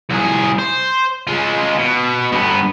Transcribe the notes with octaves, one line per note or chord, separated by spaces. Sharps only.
C2 G#4
C5
G#3 F4
B2
G2 B3